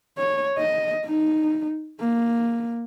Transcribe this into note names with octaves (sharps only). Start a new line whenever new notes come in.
C#5
D#5
D#4
A#3